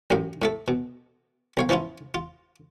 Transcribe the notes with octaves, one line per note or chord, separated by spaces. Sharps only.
A1 F#2 A2 F5
A2 A3 A4
B2
B1 C#5 F5
E3 F3 C#4 E4 F4
F4